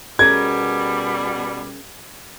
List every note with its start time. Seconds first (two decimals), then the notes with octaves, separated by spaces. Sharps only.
0.19 B2 G3 C#4 G#4 A#4 G#6